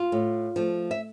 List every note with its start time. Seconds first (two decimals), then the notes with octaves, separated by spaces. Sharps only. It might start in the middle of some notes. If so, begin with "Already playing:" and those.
Already playing: F4
0.12 A2
0.56 F3 A3
0.91 E5